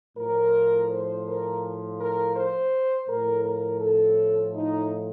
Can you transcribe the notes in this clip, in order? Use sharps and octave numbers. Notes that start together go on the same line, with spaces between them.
A2 F3 A#4
C5
A#4
A#4
C5
A2 F3 A#4
A#4
A4
D#4